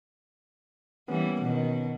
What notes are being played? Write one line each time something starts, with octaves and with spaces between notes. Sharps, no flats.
E3 G3 A#3 B3 C#4
B2 D#3